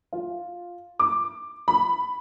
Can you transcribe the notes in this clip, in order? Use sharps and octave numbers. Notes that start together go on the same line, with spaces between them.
F4
D6
B5